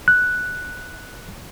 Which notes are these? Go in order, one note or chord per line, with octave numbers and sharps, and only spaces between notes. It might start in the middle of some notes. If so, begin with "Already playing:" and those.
F#6